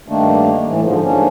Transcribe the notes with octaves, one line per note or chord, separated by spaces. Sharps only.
G2 D#3 A3 A#3 D4
A2 E3
G#2 D3 F3
G#2 A#3 C#4 D4